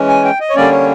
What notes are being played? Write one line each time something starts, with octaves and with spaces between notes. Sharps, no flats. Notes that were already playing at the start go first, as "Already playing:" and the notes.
Already playing: E3 G#3 C#4
G#5
G5
D#5
C#5
D3 G3 A#3 C#4 D5
C#5